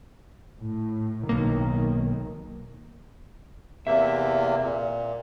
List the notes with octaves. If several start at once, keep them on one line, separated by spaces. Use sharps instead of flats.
A2
B1 D#3 A#3
E2 C3 A#3 E5
A#2